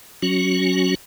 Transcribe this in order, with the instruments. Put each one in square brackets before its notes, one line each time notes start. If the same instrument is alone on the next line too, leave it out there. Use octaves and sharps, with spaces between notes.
[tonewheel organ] F#3 C#4 F#4